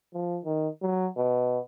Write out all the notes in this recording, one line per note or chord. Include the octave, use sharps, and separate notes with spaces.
F3
D#3
F#3
B2